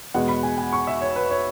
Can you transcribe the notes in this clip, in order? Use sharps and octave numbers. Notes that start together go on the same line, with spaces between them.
E2 B2 G#3 F#5
B5
G#5
G#5
C#6
E5
C#5
B4
C#5